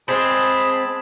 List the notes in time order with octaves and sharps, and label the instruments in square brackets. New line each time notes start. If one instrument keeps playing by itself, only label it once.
[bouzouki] G#3 C4 [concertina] G#4 A5 B5